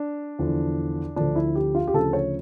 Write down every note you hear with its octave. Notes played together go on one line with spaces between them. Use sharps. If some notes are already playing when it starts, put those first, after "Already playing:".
Already playing: D4
E2 D3 F3
D2 D3 F3 D4
E4
G4
F4
G4
D2 C#3 F3 A4
C#5